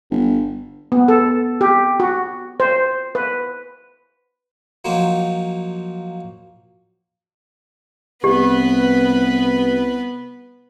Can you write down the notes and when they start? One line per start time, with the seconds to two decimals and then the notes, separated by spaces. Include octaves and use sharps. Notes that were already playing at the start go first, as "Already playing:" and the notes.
0.11 G1
0.92 B3
1.08 A4
1.61 G4
2.00 F#4
2.60 C5
3.15 B4
4.85 F3 F#3 A#3 D#4 C5
8.24 C2 B3 G4 B4